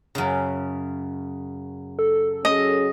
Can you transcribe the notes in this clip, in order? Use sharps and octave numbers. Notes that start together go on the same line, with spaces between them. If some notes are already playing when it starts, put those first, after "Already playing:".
F#2 C#3
A4
F#3 C#4 G#4 D#5